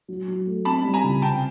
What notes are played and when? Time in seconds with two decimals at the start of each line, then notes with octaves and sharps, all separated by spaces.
0.08 F#3
0.28 F#3
0.46 A3
0.65 C4 A5 B5
0.84 G3
0.94 G#5 A#5
1.04 C#2
1.22 C3 G5 A5